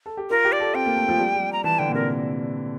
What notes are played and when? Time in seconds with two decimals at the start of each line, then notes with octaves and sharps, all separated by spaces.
0.06 A4
0.17 G4
0.30 F4 A#4
0.45 G4
0.52 D5
0.60 A4
0.74 C4 G5
0.86 A#3
0.96 A3
1.09 F3
1.19 G3
1.35 G3
1.53 A#5
1.64 E3 A5
1.79 D3 G5
1.89 A#2
1.94 C3 A#4